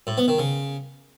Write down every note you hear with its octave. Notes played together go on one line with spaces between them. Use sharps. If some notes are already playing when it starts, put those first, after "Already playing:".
A2
B3
D#3
C#3